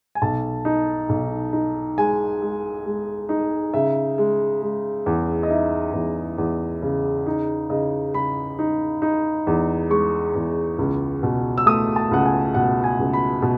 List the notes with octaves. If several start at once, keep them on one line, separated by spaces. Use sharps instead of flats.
G#5
B1 A5
D#4
B1
D#4
G#3 G#5
G#3
G#3
D#4
C#3 E5
G#3
G#3
E2
D#5
D#4 E5
E2
E2
C#3
D#4
C#3 D#5
C#3 B5
D#4
D#4
E2
G#3 C#6
E2
C#2
B2
E6
A3 D#6
A5
C#2 F#5
G#5
B2 F#5
G#5
C#2
B5
B2